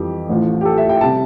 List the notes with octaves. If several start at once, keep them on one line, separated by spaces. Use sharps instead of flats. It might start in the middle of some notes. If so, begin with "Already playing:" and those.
Already playing: F2 E3 G3 G4
A1 A2 F3
G4
A4
E5
G5
C3 G3 A5